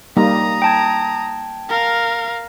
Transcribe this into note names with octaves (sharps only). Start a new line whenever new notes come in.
G3 A#3 D#4 A#5 D#6
G5 A5 G#6
A#4 F5